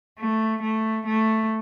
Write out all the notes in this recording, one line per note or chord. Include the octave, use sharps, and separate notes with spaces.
A3
A3
A3